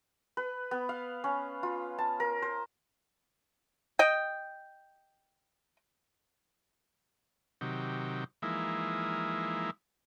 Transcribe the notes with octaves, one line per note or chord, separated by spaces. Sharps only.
B4
B3
F5
C#4
F4
A5
A#4
C5
D#5 G5
C3 D#3 F#3 G4
E3 F3 G#3 A#3 D#4 E4